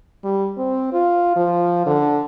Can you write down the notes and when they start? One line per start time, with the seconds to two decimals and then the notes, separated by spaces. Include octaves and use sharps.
0.24 G3
0.57 C4
0.93 F4
1.36 F3
1.86 D3